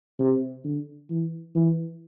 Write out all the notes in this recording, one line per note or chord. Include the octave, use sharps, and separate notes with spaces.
C3
D3
E3
E3